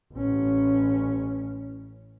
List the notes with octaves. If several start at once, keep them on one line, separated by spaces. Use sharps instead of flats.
A1 C#4